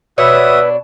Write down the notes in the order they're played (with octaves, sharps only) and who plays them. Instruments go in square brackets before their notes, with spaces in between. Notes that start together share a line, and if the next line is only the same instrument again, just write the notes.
[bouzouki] B2 D4 C#5 [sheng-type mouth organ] F#4 E5 D#6 [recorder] B4 [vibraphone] E6